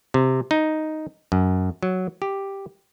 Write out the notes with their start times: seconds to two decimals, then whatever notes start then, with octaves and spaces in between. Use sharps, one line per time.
0.14 C3
0.51 D#4
1.32 F#2
1.83 F#3
2.22 G4